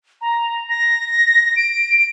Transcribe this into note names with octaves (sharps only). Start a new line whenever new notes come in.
A#5
A#6
D7